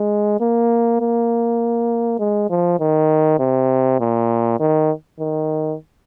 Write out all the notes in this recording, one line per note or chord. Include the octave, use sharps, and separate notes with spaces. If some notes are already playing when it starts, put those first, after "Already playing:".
Already playing: G#3
A#3
A#3
G#3
F3
D#3
C3
A#2
D#3
D#3